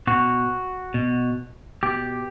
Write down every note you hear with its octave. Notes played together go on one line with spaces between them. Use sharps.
B2 F#4
B2
B2 G4